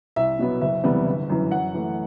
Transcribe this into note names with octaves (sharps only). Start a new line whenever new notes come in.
C2 E5
B2 F#3 B3
F#1 E5
E2 C3 G3 B3
G1
F#2 E3
F#2 F#5
E3 A3